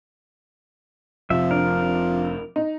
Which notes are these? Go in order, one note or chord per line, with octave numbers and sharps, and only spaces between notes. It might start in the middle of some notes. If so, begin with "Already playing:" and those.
F1 C3 F3 E5
D4 A#4
D#4